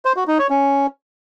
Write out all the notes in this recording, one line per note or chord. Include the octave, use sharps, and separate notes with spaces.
C5
F#4
D#4
C#5
C#4